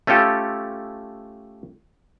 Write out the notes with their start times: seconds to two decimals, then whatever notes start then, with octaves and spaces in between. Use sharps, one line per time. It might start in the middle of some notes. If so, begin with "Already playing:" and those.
0.07 A3 C#4 F4 G4 A4